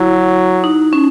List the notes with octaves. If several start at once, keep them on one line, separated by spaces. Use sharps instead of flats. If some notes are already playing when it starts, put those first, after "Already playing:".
Already playing: F#3 E4
D#4
C#4